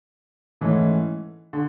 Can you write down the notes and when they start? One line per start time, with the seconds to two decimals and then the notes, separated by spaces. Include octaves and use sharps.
0.61 G#2 E3 A3 C#4
1.53 D3